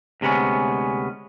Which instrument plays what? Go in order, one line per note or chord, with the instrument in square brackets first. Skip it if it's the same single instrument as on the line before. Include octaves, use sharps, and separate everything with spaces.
[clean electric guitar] D2 C3 G#3 B3 C#4